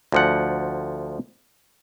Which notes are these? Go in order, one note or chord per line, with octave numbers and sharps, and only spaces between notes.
D2 F3 F#5